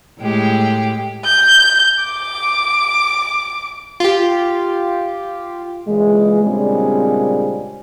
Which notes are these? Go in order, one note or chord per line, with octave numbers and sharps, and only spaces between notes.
A2 G#3 G4
G6
D6
F4 G4
A#2 C#3 E3 G#3
A#2 C#3 G3 G#3 C4 D4